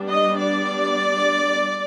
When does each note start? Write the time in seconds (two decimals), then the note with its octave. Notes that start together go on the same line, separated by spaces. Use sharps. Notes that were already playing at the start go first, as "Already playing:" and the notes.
Already playing: G3 B3 D4
0.08 D#5
0.39 D5